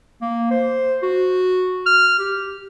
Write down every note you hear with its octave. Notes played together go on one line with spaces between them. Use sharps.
A#3
C5
F#4
F6
G4